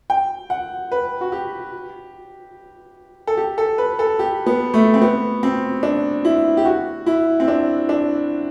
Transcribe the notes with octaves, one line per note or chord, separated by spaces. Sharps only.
G5
F#5
B4
F#4
G4
A4
G4
A4
B4
A4
G4
B3
A3
C4
B3
C4
D4
E4
G4
F#4
E4
C4
D4
D4